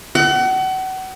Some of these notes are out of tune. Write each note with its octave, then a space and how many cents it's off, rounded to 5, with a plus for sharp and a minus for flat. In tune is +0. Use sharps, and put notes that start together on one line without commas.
F#5 +35